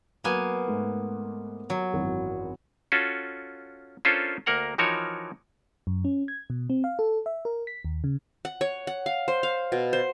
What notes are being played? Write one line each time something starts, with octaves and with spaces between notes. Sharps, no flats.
F#3 A#3 B3 G#5
G#2 A3
F#3
G#1 F#2 E3
C#4 F4 F#4 A4
C#4 D4 F4 A4 A#4 C5
D2 A#3 A#4 F#5 A#5
E3 F3 D#4 F#4 A#4 C#5
F#2
C#4
G#6
B2
C4
F5
A4
E5
A#4
B6
D#2
C#3
F#5
C#5
F#5
F5
C5
F5
B2
C5